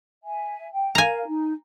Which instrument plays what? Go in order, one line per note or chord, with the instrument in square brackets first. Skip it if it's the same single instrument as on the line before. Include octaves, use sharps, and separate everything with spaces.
[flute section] E5 G#5
G5
[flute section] A#4 F5 [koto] G#5 A#5
[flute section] D#4